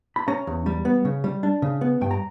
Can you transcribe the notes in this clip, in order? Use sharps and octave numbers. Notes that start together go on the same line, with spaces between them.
B5
C#4 A#5
E2
G3
B3
C#3
G3
D4
C#3
B3
G2 G5
A#5